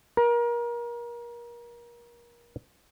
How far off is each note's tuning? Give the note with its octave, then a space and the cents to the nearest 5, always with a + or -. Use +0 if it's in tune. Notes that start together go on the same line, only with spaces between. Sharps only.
A#4 +30